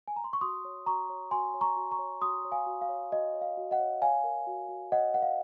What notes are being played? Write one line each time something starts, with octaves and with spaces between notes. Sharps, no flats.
G#5
A#5
C6
C#6
F#4 C6 D#6
C#5
F#4 A#5 C#6
C#5
F#4 G#5 C6
C#5
A#5 C#6
F#4
A#5 C#6
C#5
F#4 C6 D#6
C#5
F5 G#5
F#4
F5
C#5
F#4 D#5
C#5
F5
F#4
D#5 F#5
C#5
C#5 F5 G#5
A#4
F#4
F#4
C#5 D#5 F#5
A#4 F#5
F5